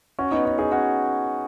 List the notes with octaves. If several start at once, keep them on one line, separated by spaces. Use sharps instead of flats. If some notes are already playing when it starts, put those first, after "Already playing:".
C#4 F#4
B3 D#4
C#4 F#4
D#4 G#4
C#4 F#4